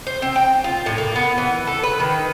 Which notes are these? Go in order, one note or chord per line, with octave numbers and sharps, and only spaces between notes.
C5
C4
G5
F4
A2
A#3
B3
E3
A4
B4
D#3